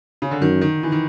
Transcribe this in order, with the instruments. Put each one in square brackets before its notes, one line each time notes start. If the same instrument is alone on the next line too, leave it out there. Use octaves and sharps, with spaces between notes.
[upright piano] C#3
D3
[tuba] F#2 [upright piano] D#3
[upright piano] D#3
E3
D#3